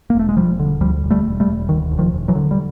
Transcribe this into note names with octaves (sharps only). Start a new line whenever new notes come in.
A#3
E1 A3
G#3
E1 F3 G3
D3
D2 F3 G3
E1
G3 A3
E1
G3 A3
E1
D2 D#3
E1
D#3 F3
E1
E3 F#3
D3
G3